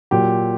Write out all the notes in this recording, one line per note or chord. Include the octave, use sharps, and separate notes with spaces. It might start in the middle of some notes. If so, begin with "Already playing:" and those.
A#2 F#3 G4